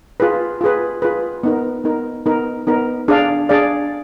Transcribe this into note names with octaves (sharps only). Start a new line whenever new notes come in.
F4 G#4 B4
F4 G#4 B4
F4 G#4 B4
B3 D#4 A#4
B3 D#4 A#4
B3 D#4 A#4
B3 D#4 A#4
D4 G#4 D5 F5
D4 G#4 D5 F5